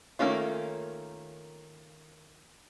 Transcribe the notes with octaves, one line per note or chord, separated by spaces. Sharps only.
D#3 A3 A#3 C#4 F4